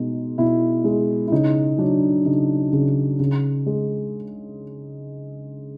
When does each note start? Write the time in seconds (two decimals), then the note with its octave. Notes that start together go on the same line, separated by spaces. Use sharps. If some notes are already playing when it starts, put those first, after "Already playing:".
Already playing: B2 G#3 D#4
0.38 B2 E4
0.84 G#3
1.27 E4
1.32 C#3 D#4
1.78 F#3 D4
2.25 C#3 D#4
2.73 C#3
3.19 C#3
3.66 G#3